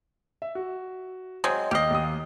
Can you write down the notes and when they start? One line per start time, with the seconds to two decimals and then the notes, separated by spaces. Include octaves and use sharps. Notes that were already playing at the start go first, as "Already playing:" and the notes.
0.42 E5
0.55 F#4
1.44 F#3 G#3 C4 D#5 C6
1.71 D#2 G4 D#5 F6 C7
1.90 D#2 D#6